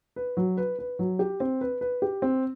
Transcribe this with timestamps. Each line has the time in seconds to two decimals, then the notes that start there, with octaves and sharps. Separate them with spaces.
0.16 B4
0.37 F#3
0.57 B4
0.79 B4
0.99 F#3
1.19 G4
1.40 C4
1.61 B4
1.81 B4
2.02 G4
2.22 C4